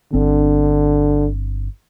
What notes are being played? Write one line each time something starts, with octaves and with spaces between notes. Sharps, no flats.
G1 D3 C4 D4